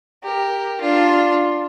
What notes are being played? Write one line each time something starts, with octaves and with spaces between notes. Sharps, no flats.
G4 A#4
D4 F4